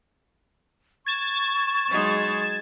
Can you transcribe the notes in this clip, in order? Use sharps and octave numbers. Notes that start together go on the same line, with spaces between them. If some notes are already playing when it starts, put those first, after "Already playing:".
C#6 G#6 A6 E7
F#3 G#3 D#4